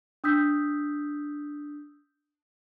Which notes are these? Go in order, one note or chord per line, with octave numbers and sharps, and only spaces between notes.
D4 D#6 E6 G6 B6